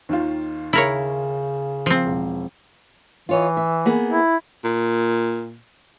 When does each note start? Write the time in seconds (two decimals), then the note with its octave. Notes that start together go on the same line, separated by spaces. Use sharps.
0.09 D#2 D#3 F4
0.73 C#3 E4 A#4 C#5
1.86 F3 C4
2.05 E1
3.29 E3 F4 C#5 D#5
3.57 E5
3.86 A#3 B3 G#4
4.09 E4
4.64 A#2